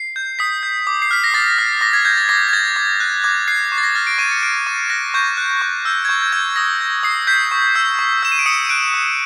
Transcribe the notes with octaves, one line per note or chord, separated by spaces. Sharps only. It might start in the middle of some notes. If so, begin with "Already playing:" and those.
Already playing: C7
G6
D#6 B6
G6
D6
C7
F6 B6
A#6
D6 A6
F6
D6 A#6
G#6
G6 G#6
A6
D6 A#6
G#6
G6 A6
D6
F#6
D6 G#6
F#6 C7
C#6
A6
A#6
F6 A6
D7
C#6 D#7
C#7
F6 D7
C#6 D#7
F#6 A#6
C#6 G6
F#6
C#6
E6 G6
G#6
C#6 G6
G6
E6 G6 G#6
D#6 A#6
G6
D#6 C7
G6 B6
C#6
E6 G6
C#6
E6 G6 E7
D#7
D7
D#6 C#7
D#7
F#6 D7
D#6